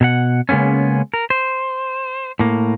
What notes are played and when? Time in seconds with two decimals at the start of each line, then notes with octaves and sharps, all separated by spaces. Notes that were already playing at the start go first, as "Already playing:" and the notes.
0.01 B2 A#4 F#5
0.49 C#3 G#3 A#3 B3 C#4
1.14 A#4
1.30 C5
2.39 A2 A#3